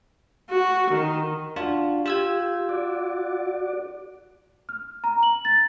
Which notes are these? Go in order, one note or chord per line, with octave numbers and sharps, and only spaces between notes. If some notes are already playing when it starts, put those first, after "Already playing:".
F#4
D#3
D4 F4 F#4
F4 G4 E6 G#6
F#4 D5
F6
A#5
F#7
A6